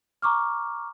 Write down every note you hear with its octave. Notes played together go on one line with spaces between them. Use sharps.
A#5 C#6 D6 F6